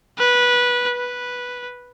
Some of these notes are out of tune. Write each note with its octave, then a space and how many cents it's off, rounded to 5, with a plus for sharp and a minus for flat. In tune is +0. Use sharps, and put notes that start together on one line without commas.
B4 -15
B4 -5